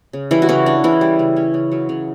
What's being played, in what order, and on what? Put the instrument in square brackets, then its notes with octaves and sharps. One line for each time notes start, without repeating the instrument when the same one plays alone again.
[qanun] C#3
E3 G3 E4
F#4
C#3 E3 E4
C#4 D4
C#3 E3 E4
G3
C#3
C#4
C#3
F#3
C#3